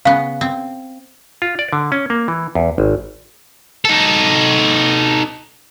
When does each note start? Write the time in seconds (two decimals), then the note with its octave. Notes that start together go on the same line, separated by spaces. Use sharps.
0.05 C#3 B3 F5
0.41 C4
1.42 F4
1.59 D5
1.73 D3
1.92 C#4
2.10 A#3
2.28 E3
2.55 E2
2.78 G#1
3.85 D#4 A4